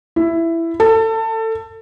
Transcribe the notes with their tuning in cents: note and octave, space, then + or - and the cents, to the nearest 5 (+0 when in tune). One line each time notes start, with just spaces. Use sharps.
E4 +10
A4 +25